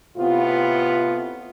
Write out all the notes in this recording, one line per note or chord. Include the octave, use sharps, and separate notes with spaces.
A2 C3 B3 F4